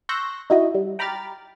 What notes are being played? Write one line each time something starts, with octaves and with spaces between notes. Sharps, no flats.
C6 C#6 E6 F#6 G6 A#6
D#4 E4 F#4 D#5
G3
G5 A#5 B5 D6 F6 A6